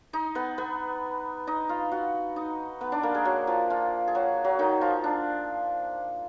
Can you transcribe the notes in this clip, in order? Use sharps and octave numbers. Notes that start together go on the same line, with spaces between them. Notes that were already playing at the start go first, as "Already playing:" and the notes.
D#4 D#5
B3 B4
B3 B4
D#4 D#5
F4 F5
F#4 F#5
D#4 D#5
B3 B4
D4 D5
A#3 A#4
G#3 G#4
F#3 F#4
F3 F4
F3 F4
G#4
F#3 F#4
F#3 F#4
D#3 D#4
F3 F4
D4